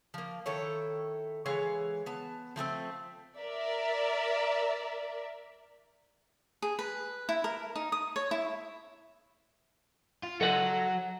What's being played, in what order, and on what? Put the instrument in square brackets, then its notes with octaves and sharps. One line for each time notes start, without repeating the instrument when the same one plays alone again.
[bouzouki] F3 A#3
D#3 E4 A4 C#5
E3 G#3 C#5 F5
B3 A5
F3 A3 B3 C4
[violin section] A#4 D5 E5
[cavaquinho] G#4
B4
E4
A#4
D#4
D#6
C#5
E4
[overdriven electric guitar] F4
[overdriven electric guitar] F#3 F#4 [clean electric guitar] A4 D#5 F#5